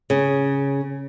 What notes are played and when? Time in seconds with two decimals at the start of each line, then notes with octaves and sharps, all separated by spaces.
0.10 C#3